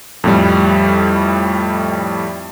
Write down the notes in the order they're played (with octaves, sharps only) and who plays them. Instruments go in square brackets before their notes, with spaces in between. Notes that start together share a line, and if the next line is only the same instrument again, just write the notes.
[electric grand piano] F2 A2 G3